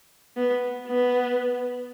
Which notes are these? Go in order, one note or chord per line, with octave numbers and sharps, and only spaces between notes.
B3
B3